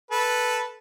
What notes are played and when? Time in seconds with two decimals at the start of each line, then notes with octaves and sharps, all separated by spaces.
0.11 A4 B4